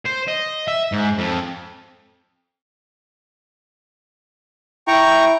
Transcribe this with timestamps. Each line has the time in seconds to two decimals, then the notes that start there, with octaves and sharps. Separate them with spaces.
0.05 C5
0.28 D#5
0.68 E5
0.92 G#2
1.18 F2
4.88 E4 G5 A#5 C#6